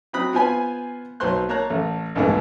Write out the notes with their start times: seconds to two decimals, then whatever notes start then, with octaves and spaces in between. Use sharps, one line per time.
0.13 F#3 C4 B5 D#6 F#6
0.33 B3 F4 C5 G#5 B5
1.20 B1 F#3 C5 C#5 C6 F#6
1.49 A#3 C#5 A5 A#5 F#6
1.70 A1 A3
2.15 B1 F2 G#2 E3 A3 A#3